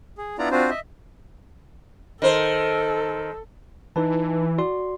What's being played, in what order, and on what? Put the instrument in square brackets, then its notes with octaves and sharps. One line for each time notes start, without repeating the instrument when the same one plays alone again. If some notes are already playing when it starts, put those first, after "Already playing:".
[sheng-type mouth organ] G#4
B3 D4 E4 F4 D5 A#5
C4 D4 F4 F#4 C5
D#5 E5
[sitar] D#3 C5 [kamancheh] A4
[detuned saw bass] E3 [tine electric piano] D#4 B4 A5
[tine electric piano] F#4 D5 C6